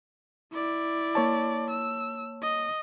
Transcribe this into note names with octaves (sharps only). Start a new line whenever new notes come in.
E4 D5
A#3 C#5 A5
E6
D#5